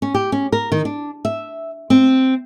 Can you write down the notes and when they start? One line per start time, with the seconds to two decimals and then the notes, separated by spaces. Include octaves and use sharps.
0.02 C#4
0.14 G4
0.32 C#4
0.52 A#4
0.72 D#3
0.85 D4
1.25 E5
1.90 C4